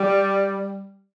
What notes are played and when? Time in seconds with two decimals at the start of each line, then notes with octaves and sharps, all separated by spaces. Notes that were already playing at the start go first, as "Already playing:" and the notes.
Already playing: G3